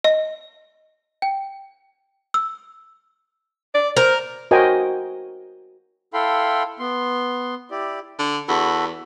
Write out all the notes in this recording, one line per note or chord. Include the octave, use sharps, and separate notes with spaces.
D#5
G5
E6
D5
A#4 C5
F#4 A#4 C5 D#5 G5 G#5
E4 A4 F5 G5 B5 C6
B3 C6
E4 G4 D5
D3
E2 F#4 A4 B5